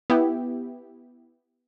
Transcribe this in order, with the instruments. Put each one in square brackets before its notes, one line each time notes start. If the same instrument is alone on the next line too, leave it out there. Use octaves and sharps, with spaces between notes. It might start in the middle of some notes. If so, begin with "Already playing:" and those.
[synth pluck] B3 E4 G4